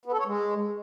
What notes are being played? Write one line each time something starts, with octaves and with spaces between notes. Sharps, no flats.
B3
A4
C#5
G#3